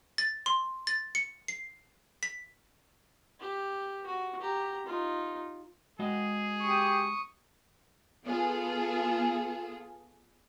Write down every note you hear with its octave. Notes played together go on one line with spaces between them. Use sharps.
A6
C6
A6
C#7
C7
B6
G4
F#4
G4 A#5
D#4 F4
G#3 F#4 G#4 D#5
G4 C#6 D#6
B3 F4 G#4 A4